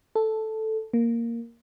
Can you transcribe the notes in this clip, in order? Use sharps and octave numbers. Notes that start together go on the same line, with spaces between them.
A4
A#3